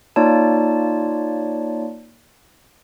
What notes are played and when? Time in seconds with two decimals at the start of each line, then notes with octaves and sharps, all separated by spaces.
0.16 A#3 D#4 F4 C#5 D5 A5